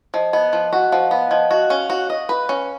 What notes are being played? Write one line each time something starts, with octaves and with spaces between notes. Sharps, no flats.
F3 D#5
B3 D#5
F3
F#4 F#5
F3 F5
B3 F5
F3 D#5
F#4 D#5
C#4 F5
F#4
D#5
B4
C#4